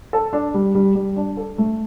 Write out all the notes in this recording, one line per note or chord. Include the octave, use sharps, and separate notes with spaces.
A4
D4
G3
G3
G3
D4
A4
A3